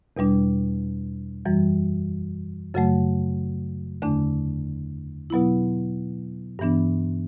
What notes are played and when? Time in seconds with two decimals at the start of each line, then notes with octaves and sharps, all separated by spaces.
0.17 E2 B2 G3 D4
1.46 F#2 E3 G3
2.74 F#2 C#3 F#3 A3
4.02 E2 D3 A3 D4
5.30 B2 F#3 B3 E4
6.59 G2 E3 B3 D4